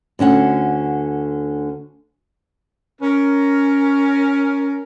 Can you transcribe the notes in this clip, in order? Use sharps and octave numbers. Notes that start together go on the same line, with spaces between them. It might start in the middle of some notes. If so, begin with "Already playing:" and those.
D2 D3 C#4 F#5
C#4 A#4